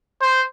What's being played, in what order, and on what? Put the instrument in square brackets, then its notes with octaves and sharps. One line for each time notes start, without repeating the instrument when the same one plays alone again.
[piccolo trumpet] C5